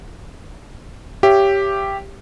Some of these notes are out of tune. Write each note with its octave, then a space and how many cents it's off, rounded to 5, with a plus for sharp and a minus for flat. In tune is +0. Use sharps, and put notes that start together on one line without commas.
G4 +0 C#5 +0 E5 +30